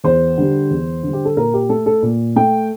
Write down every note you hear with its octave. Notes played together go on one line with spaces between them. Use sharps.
E2 C5
D3 G3
E2
D3
G3
G4
A4
A#2 A#4
G4
A3 A4
A4
A#2
A3 G5